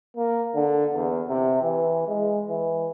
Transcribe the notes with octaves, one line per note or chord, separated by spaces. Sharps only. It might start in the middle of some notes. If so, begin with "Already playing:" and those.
A#3
D3
E2
C3
E3
G#3
E3